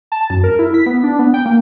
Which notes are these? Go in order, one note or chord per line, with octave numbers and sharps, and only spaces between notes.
A5
F#2
A#4
E4
B6
B3
D4
B3
G5
A#3